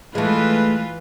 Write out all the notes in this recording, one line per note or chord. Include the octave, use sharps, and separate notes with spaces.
E3 G#3 A3 F4 B4